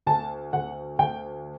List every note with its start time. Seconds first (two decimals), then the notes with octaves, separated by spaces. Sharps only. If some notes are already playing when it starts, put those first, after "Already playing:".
0.06 D2 A5
0.53 D2 F#5
0.99 D2 G5